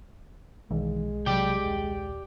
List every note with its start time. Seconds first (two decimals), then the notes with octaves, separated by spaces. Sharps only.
0.71 B1 D#3 E3 G#3
1.26 C3 F#3 G4 D5 G5
1.64 D#1